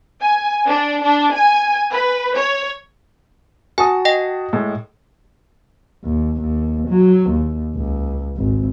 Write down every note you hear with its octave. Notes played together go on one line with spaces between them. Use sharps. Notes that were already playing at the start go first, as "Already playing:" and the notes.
G#5
D4
D4
G#5
B4
C#5
F#4 G#5 A5 D#6
D#5 G5 A#6
A2 G#3
D#2
D#2
F#3
D#2
C#2
G#1